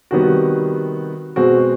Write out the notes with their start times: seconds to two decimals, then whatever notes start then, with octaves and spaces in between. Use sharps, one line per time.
0.11 C3 D#3 G3 B3 F#4
1.36 B2 G#3 C4 F#4